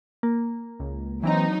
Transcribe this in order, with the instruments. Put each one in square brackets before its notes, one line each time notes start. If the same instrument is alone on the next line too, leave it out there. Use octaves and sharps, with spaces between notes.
[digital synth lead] A#3
[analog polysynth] C#2
[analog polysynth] E3 C4 A#5 [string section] F#3 D#4